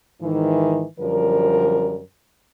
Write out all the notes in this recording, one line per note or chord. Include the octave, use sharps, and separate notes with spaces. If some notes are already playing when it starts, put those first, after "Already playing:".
G#2 D#3 E3
F#2 D3 F3 G3 A#4